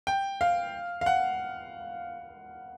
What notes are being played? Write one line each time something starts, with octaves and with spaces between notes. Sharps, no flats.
G5
F5
F5
F#5